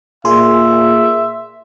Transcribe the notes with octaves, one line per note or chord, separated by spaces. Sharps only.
A#2 G#4 E5 C6